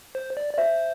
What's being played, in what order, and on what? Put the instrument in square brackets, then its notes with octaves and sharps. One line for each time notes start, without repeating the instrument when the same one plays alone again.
[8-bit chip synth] C5
D5
D5
[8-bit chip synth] C5 [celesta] E5